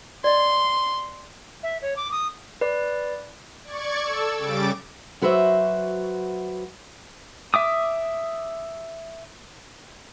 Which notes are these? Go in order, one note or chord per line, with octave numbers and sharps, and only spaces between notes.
D5 D#5 C6
E5
C#5
D6
D#6
B4 D5
D5 C#6 G#6
A4 E6
C#3 G3 D6 A6 D7
F#3 F#4 B4 C5 E5
E5 D6 D#6